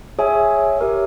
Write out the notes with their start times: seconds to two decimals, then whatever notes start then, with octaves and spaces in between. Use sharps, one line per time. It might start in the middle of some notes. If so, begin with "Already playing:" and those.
0.19 G#4 C#5 E5 G#5
0.78 G4 A#4 C#5 E5